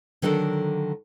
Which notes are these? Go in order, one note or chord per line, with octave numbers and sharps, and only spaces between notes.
D3 D#3 F#3 D4 A4 A#4